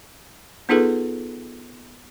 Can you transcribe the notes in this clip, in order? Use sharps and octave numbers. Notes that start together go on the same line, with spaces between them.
B3 D#4 F4 G#4 A4 B4